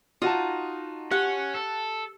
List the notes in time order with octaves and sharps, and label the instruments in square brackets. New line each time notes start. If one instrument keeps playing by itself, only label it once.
[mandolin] D#4 [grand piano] F4 F#4 A5
[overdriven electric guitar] C#4 [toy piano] G4 [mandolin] F#5
[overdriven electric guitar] A4